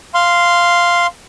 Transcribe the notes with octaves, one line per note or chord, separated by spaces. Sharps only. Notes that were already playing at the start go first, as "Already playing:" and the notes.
F5 C6